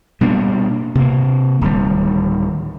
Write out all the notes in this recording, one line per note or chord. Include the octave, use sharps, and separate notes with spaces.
B2 G3 A#3 D4
C3 A#3
D1 D#3 G3